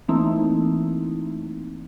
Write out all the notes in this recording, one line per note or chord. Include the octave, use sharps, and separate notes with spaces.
E3 A3 A#3 C4 D#4 E4